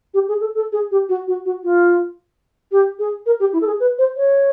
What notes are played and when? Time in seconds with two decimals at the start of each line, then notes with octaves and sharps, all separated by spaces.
0.14 G4
0.28 G#4
0.41 A4
0.55 A4
0.72 G#4
0.91 G4
1.09 F#4
1.27 F#4
1.45 F#4
1.64 F4
2.72 G4
2.99 G#4
3.26 A#4
3.40 G4
3.53 E4
3.61 A4
3.67 G#4
3.80 B4
3.99 C5
4.16 C#5